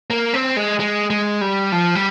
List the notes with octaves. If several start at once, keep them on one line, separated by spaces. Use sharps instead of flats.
A#3
C4
G#3
G#3
G#3
G3
F3
G3